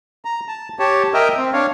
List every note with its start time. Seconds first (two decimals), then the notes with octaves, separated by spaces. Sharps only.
0.25 A#5
0.48 A5
0.79 G4 C#5 A5
1.14 A#4 D#5 E5 G5 A#5
1.37 C4
1.53 D4 C#5 F5